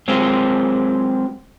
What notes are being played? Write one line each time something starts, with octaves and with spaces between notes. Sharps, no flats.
F#3 G#3 C4 F4 G4 C5